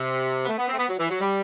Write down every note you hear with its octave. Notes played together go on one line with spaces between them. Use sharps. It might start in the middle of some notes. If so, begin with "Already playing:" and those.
Already playing: C3
B3
A3
B3
C4
A3
B3
F#3
E3
F#3
G3